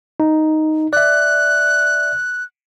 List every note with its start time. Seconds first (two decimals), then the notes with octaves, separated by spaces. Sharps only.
0.20 D#4
0.93 D5 E5 F#6